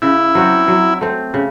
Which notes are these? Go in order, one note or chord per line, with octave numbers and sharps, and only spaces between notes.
C#3 E4
F#3 C4 F#4
F#3
A3 C4
C#3